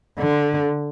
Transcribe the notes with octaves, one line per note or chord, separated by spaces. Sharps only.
D3